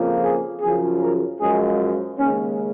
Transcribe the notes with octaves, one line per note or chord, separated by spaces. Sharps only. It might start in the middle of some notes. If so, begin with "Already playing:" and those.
Already playing: F2 C#3 F3 A#3
G#4
F#2 C#3 F3 G#4
A#4
F#2 F3 G#3 G#4
F4
D#2 C#3 G#3 C#4